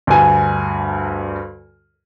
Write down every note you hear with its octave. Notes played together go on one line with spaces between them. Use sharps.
D2 G2 G#5